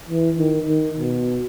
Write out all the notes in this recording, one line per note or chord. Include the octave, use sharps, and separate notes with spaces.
E3
D#3
D#3
B2